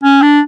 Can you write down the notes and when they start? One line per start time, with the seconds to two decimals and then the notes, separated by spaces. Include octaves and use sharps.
0.04 C#4
0.22 D4